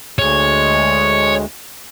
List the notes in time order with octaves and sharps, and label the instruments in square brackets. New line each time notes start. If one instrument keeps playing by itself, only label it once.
[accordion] D2 G#3 [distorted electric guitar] C#5